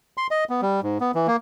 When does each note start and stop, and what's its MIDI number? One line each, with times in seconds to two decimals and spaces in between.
0.18 0.27 84
0.31 0.44 75
0.50 0.61 59
0.62 0.80 55
0.83 0.98 44
1.00 1.11 59
1.15 1.27 52
1.27 1.36 58